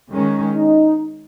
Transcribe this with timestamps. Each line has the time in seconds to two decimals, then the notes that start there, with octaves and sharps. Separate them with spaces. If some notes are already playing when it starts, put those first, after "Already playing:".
0.13 D#3 G#3 C#4
0.56 D#4